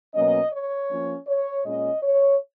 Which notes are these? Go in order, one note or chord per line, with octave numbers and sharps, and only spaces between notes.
B2 F#3 A#3 C#4 D#5
C#5
F3 A#3 C#4
C#5
A#2 G#3 C#4 D#5
C#5